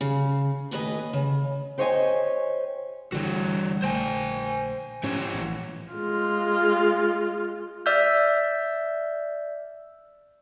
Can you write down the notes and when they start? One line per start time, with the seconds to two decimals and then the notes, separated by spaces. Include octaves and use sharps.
0.01 C#3
0.71 D#2 A2 B4 C5 D#5 G#5
1.13 C#3
1.78 G4 C5 C#5 D#5 G5 G#5
3.12 G1 D3 E3 G3 F#4
3.82 A#1 D3 A3 C5 G5 G#5
5.03 G#2 F3 C#4 G4 C#5
5.33 A#1 A2 E3
5.92 G#3 F4
7.86 D5 E5 E6 F6 G6